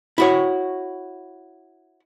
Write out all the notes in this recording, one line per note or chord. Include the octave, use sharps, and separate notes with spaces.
E4 F#4 C#5